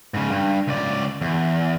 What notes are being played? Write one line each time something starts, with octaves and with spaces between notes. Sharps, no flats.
G#2 C#3
G2
C#2 D5
E2